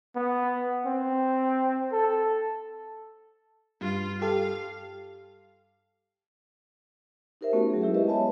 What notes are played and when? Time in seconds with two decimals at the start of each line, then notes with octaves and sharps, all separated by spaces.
0.15 B3
0.86 C4
1.92 A4
3.81 G2 F4
4.22 G4 A4 F5
7.41 D#4 G4 A#4 C5 E5
7.53 A3 B3 C#4 F#4
7.70 F#3 G#4
7.82 G#3 E4 G4 E5
7.94 B4 D#5 E5
8.08 B3 B4 C#5 E5 G#5 A5